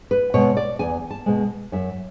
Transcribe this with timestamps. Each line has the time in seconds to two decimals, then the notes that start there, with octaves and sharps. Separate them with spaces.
0.11 B4
0.34 B2 G#3 C#5
0.57 D5
0.79 E2 G#5
1.11 A5
1.26 B2 G#3
1.72 F#2 E5